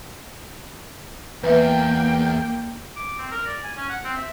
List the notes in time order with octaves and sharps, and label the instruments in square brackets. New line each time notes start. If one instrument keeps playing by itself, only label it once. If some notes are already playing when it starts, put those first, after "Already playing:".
[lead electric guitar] E2 [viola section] A#3 G5 [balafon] B4 E5
[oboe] D6
C4
A#4
D5
G#5
C#4
F#5
C4
E5